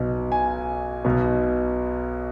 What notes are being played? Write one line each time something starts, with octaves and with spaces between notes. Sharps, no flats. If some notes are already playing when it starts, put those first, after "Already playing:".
Already playing: B1 B2
G#5
B1 B2